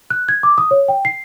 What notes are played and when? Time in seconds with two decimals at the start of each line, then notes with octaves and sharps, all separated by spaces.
0.10 F#6
0.29 G#6
0.43 D6
0.58 D#6
0.71 C#5
0.88 G5
1.05 C7